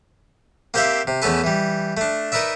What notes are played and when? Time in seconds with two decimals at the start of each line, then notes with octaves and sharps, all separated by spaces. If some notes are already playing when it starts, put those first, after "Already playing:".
0.74 A#3 C4 G4 C5 E5 F5
1.07 C3
1.22 E2 A3 C#4 A4 B4
1.44 E3 G3
1.97 A3 D4
2.32 D#4 A#4 B4 D5 E5